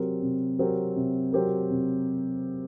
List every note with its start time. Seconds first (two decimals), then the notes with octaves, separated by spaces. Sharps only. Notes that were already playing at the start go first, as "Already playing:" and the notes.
Already playing: C3 F#3 C4 G4 A#4
0.22 C3
0.59 F#3 C4 G4 A#4
0.96 C3
1.32 F#3 C4 G4 A#4
1.70 C3